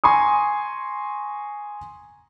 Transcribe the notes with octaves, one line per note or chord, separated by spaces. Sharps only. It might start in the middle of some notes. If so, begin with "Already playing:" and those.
G#5 A#5 C6 C#6 D#6